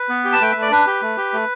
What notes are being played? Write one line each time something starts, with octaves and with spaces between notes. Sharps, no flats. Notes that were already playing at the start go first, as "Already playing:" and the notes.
Already playing: B4
B3
G4
A5
A3 G5
A3 E5
D5
D4 B4
G4
A3
G4
A3